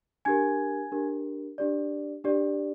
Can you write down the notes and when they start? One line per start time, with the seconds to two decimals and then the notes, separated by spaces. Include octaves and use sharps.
0.25 D4 G4 A#4 G#5 G#6
0.92 D4 G4 A#4
1.58 D4 G4 D5
2.24 D4 G4 D5